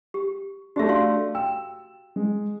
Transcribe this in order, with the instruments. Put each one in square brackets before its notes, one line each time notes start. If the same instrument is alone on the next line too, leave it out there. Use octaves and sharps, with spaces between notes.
[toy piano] G4
[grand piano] A3 D4 [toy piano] F#4 G4 E5
[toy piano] F#4 F5 C6
[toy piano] G5 [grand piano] E6
[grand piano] G#3